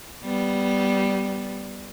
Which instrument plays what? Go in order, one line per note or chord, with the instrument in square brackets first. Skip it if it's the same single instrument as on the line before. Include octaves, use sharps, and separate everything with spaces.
[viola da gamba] G3 B3